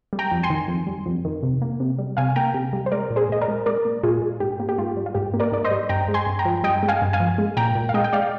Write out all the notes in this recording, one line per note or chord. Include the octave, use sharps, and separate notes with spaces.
G3
G5 A#5
F2
G#5 C6
D#3
F2
G3
F2
D#3
C3
A#3
C3
G3
C3 F5 G#5
A#3 G5 A#5
C3
G3
C5
G#3 A#4 D5
A#2
G#4 C5
A#2 D#5
A#4 D5
G#3
G#3 A#4 D5
A#2
A#2 F4 G#4
G#3
G#2 G4
A#3
G4
G#2 F4
G3
F4
G#2 G4
A#3
A#4 D5
G#2 D5
C5 D#5
G3
G2 G5 A#5
G#3
G#5 C6
G2
G5 A#5
F3
G2 D#5 G5
G#3
F5 G#5
G2
F5 G#5
F3
G#3
A#2 G5 A#5
A#2
F5
G#3 D#5 G5
G5
G#3 D5 F5